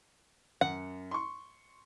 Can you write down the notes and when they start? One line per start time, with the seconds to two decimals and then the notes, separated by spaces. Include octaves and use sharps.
0.61 F#2 F#5
1.11 C6 C#6